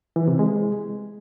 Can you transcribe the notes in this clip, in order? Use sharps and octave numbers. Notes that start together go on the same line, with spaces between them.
E3
C3
G#3